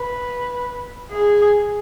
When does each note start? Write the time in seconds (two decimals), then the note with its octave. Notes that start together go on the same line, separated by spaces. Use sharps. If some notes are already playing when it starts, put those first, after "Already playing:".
Already playing: B4
1.12 G#4